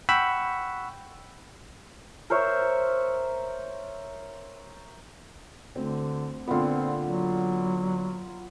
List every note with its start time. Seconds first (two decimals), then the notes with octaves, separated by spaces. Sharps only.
0.09 F#5 G5 B5 C#6 E6
2.30 A#4 C5 C#5 E5
5.75 D2 D3 C4
6.47 A#2 D3 B3 C4 F4
7.05 F#3